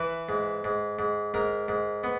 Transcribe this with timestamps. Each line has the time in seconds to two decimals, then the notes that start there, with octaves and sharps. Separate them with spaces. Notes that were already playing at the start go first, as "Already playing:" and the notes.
Already playing: E3 B4
0.29 G#2
0.64 G#2
0.99 G#2
1.34 G#2 A#4
1.68 G#2
2.04 B3